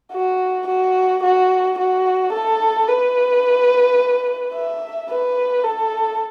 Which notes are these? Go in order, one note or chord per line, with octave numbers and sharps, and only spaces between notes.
F#4
F#4
F#4
F#4
A4
B4
E5
B4
A4